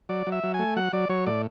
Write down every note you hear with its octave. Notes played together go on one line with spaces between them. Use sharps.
F#3 D5
F#3
E5
F#3
G#5
A3
F#3 F#5
F#3 D5
F#3 C#5
A2 D5